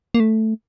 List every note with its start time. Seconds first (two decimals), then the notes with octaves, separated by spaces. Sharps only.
0.14 A#3
0.20 A3